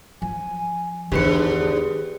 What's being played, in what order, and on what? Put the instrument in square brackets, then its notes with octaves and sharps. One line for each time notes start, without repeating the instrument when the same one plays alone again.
[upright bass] F3 [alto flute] G#5
[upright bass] E2 D#3 [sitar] G#2 D3 [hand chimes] G4 B4 C#7 [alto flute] G#4